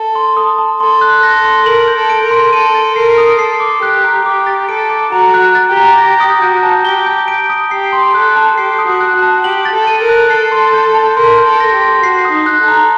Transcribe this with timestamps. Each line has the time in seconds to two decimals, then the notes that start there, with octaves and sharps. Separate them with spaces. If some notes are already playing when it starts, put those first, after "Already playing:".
Already playing: A4 A5
0.15 C6
0.37 D#6
0.58 A5
0.80 A4 C6
1.01 F#6
1.23 A4 A#6
1.45 C6
1.66 A#4 F#7
1.88 G6
1.96 A4
2.10 D7
2.23 A#4
2.31 C6
2.53 A4 D#7
2.75 A6
2.96 A#4 C7
3.18 D#6
3.39 A4 C7
3.60 D6
3.82 G4 F#6
4.04 A#5
4.25 G4 D6
4.47 A6
4.69 A4 D7
4.90 D6
5.12 F#4 A#5
5.34 F#6
5.55 A6
5.69 G4
5.77 A#5
5.98 G4 A#6
6.20 D#6
6.42 F#4 G6
6.63 A5
6.85 G4 G7
7.06 G6
7.28 D7
7.50 D#6
7.71 G4 C7
7.93 C6
8.14 A4 F#6
8.36 A5
8.57 G4 C7
8.79 D#6
8.86 F#4
9.01 F#6
9.16 F#4
9.22 A5
9.44 G4 F#7
9.65 A6
9.73 A4
9.87 D#7
10.02 A#4
10.09 F#6
10.30 A4 C7
10.52 C6
10.74 G6
10.95 A5
11.17 A#4 C6
11.38 G6
11.46 A4
11.60 A#6
11.74 G4
11.82 C6
12.03 F#4 C7
12.25 D#6
12.32 D#4
12.46 F#6
12.61 A4
12.68 A#5